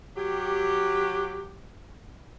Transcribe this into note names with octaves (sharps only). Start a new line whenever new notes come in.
F#3 G4